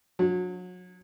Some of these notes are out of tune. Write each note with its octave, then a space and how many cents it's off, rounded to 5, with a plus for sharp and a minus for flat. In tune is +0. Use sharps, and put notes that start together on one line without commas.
F#3 -30